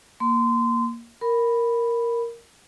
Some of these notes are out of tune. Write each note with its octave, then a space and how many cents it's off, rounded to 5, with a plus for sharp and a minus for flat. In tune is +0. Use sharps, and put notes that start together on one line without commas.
A#3 +0 C6 -25
A#4 +0 B5 +0